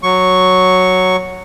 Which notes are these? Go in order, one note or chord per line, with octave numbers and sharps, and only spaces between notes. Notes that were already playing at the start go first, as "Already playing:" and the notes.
F#3 C#6